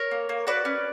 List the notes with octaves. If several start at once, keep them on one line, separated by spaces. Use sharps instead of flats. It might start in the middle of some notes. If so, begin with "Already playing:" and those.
Already playing: A#4 C#5
A#3
A#3
F#4 B4 D5
C#4